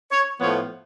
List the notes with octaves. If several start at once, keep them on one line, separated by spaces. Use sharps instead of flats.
C#5
A2 F3 B3 C#5